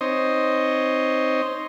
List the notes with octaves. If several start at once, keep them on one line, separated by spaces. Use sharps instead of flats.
C4 D#4 C5 C#5 D#5